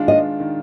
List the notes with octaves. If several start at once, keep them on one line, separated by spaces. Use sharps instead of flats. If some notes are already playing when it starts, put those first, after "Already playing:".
Already playing: D#3 G#3 D4 F4
D#5
D#3